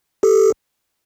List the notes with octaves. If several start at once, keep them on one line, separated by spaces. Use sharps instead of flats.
G4 A4